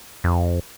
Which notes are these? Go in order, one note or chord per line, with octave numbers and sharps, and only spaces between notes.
F2